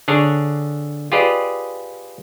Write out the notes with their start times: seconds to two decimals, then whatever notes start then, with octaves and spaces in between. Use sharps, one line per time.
0.08 D3 D4 G#4 C#5
1.12 F4 G4 G#4 B4 D5 D#5